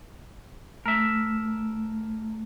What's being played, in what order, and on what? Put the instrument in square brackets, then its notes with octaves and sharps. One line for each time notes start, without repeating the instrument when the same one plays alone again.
[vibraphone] A3 [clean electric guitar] A#4 E5